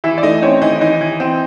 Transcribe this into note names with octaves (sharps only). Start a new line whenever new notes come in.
E3 E4 E5
D5
A3 D#4 D#5
C4 C#4 C#5
E3 D#4 D#5
E3 D#4 D#5
E3
C4